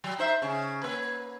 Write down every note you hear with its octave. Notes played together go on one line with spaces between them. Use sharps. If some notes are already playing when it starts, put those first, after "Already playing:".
F#3
D#4 C5 E5
C#3 C#4
A#3 B4